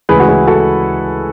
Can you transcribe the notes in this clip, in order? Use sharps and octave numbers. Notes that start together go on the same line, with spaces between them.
D2 C#3 E3 G#3 G#4 B4
F#4
E4 G#4
F#4 A4